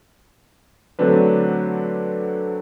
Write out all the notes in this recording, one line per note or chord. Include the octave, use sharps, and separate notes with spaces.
D3 F#3 A3 C4 D4 B4